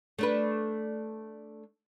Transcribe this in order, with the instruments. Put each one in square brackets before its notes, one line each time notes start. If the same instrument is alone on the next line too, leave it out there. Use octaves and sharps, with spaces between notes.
[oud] A3 D4 B4